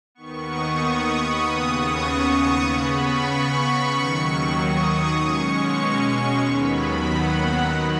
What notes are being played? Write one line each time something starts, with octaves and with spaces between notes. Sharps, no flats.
D#2 D#3 B3 C#6
D#6
C#6
B5
D#2 C#3 B3 D#6
C#6
D#6
C#6
C#3 B3 B5
C#6
C#6
D#2 D#3 F#3
D#6
B2 G#3 C#4 C#6
D#2 D#3 F#3 B3 B5
F#5
F#5
D#3 F#3 D#5